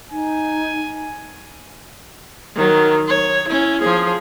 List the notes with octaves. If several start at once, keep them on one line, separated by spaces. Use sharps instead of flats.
D#4 G#5
D#3 F#3
C#5
C#4 E4
F3 G#4